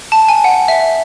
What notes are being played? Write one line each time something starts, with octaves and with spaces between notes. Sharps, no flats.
A5
G#5
F#5
E5